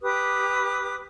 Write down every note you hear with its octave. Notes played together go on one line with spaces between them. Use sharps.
G4 B4 D6 D#6